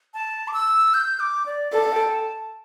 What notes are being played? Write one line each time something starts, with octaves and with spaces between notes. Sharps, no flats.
A5
D6
E6
G6
D6
D5
A4 D5
G5
A5